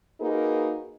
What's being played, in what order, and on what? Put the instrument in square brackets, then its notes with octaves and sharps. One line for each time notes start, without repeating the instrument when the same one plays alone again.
[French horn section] A#3 D#4 F#4 G#4 A#4 B4